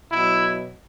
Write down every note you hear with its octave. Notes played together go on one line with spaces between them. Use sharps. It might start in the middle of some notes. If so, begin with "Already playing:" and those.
B2 F#3 E4